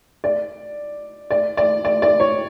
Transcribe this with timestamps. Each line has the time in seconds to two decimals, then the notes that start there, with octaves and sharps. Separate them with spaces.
0.24 D5
1.31 D5
1.57 D5
1.85 D5
2.02 D5
2.20 C#5